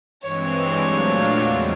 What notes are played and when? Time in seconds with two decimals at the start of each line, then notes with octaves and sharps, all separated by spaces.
0.22 G2 E3 G#3 C4 C#5
0.79 A#2 F#3 A3 D4 F4
1.36 E2 C#3 F3 G#3 C4